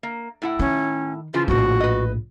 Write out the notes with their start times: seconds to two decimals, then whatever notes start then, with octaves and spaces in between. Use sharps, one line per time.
0.03 A#3
0.42 A2 E4 F#5
0.59 D#3 C#4
1.34 C#3 E3 F3 F4
1.48 A#1 A2 F#4
1.80 B4 D#5